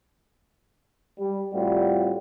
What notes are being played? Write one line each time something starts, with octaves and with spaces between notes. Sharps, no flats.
G3
A2 G3 C4 F4 F#4